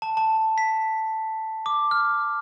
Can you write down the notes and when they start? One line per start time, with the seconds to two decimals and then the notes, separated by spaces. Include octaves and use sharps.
0.02 A5
0.17 A5
0.58 B6
1.66 D6
1.91 F6